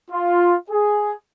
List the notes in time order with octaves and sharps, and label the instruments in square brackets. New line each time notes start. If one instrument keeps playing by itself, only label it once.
[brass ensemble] F4
G#4